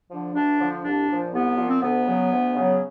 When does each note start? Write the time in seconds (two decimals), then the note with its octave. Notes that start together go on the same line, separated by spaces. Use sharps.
0.10 D3 F3
0.34 D2 D4
0.58 D3 F3
0.83 C2 D4
1.07 A#2 F3
1.31 C2 B3
1.56 A#2 F3
1.68 C4
1.81 D2 B3
2.05 C#3 F#3
2.30 D2
2.55 C#3 F#3